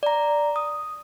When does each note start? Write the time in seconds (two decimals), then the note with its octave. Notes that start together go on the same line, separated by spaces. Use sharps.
0.03 D5 A#5
0.56 D#6